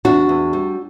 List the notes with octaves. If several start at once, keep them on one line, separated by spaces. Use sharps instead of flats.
E2 D4 F#4
E2
G3